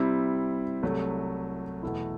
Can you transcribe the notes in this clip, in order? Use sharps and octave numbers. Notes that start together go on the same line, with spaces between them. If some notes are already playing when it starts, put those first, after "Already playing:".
Already playing: C3 G3 C4 E4
C2 C3 F#3 A3
E2 B2 A3 E4